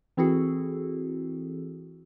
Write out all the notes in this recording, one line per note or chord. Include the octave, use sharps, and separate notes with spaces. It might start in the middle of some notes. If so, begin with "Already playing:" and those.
E3 C4 E4 F#4 G#4 A4